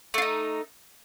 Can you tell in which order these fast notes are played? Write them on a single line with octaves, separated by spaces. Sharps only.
A3 F4 D#4